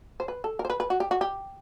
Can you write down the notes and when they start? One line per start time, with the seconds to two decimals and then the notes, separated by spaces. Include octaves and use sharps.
0.20 C5
0.28 B4
0.44 A4
0.59 A#4
0.65 C5
0.70 B4
0.80 B4
0.90 F#4
1.00 G4
1.11 F#4
1.21 G4